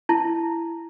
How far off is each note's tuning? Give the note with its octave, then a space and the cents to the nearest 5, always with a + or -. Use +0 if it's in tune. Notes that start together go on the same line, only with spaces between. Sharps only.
E4 +15 A5 +0